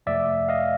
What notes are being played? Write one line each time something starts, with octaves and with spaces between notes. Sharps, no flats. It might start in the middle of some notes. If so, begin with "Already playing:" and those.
F2 C3 F3 A3 D5 E5
D#5 F5